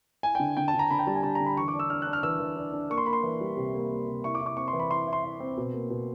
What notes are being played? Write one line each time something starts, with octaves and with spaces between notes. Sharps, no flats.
E4 G#5
D3 G5
D3 G5
A5
D3
A#5
D3 B5
G5
G3 A5
G#5
D3 A5
D3 A#5
B5
E3 C#6
D6
D4
E6
D4 F6
F#6
D4
F6
E3 E6
E3
D4
D4
A#3 C#6
C6
A#3 B5
C6
E3
G3
C3
A#3
A#3
C3
E4 C#6
D6
E4
D6
C4 C#6
C6
E3
B5
E4 C6
E4
C6
E4
C4
B2
A#3
B2